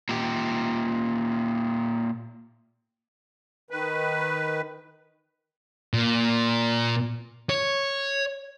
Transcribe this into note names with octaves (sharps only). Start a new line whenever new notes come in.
A#2 G4
D#3 B4
A#2
C#5